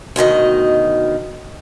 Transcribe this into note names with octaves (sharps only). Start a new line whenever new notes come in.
D2 B2 D#3 D#5